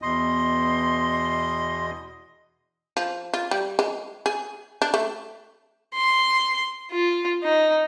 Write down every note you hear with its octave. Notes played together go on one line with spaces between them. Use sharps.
E2 B2 D#5 C6
F3
F4
G3
G#3
G#4
D4
A3
C6
F4
D#4